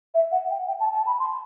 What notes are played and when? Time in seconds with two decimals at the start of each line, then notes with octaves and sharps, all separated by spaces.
0.14 E5
0.32 F#5
0.50 G5
0.68 G5
0.80 A5
0.93 A5
1.06 B5
1.19 C6